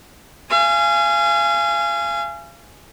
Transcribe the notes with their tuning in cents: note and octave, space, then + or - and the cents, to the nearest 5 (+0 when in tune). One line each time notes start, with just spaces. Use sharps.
F5 -35 G#5 +0